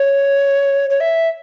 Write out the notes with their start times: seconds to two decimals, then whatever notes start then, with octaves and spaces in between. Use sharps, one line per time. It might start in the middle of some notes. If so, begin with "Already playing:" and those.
Already playing: C#5
0.90 C#5
1.00 E5